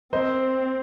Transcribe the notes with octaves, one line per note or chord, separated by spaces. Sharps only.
C4 C5 D#5